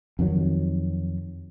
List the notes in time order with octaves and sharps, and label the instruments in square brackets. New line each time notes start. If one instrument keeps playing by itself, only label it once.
[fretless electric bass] F2 D#3 F#3